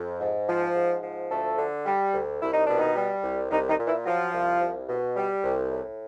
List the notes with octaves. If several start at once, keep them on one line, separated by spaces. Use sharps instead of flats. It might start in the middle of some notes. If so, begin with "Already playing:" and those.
Already playing: F2
G#2
F3
G#2
F3
D2 A3 A4
D3
G3
D2
C2 E4
D#4
B2 D4
D#3 D#4
G3
C2
C2 D#3 D#4
D#3 D#4
A#2
E3 E4
F3 F#3 F4
C2
C2
B2
G3
C2
A2